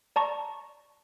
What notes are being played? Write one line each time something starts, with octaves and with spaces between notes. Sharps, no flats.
D5 A5 A#5 C#6